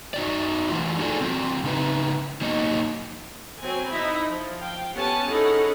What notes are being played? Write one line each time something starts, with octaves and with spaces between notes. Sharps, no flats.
D#4 F#4 D5
E3 A3 F4
D#4 F#4 G#4 A4 D5
F#3 C4
C#3 D#4 B4
F#3 A#3 D#4 C#5 D#5
F#3 C4 G#5
D#4 E4 D#5 E5 B5
F3
F5 G5
B3 C#4 G4 F#5 G#5 A5
C#4 D#4 E4 G#4 A4 F#5